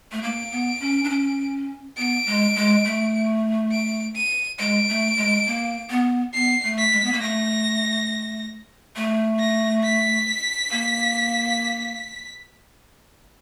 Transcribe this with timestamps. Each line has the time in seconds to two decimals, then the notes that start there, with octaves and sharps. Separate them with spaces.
0.12 A3
0.23 A#3 D7
0.51 B3
0.80 C#4
1.04 D4
1.10 C#4
1.97 B3 D7
2.26 G#3
2.56 G#3
2.85 A3
3.72 D7
4.16 D#7
4.59 G#3 D7
4.89 A3
5.17 G#3
5.46 A#3
5.90 B3
6.34 B3 C7
6.64 A3
6.78 B6
6.92 G#3
7.04 B3
7.13 A#3
7.21 A3 A#6
8.96 A3
9.40 A#6
9.84 B6
10.72 A#3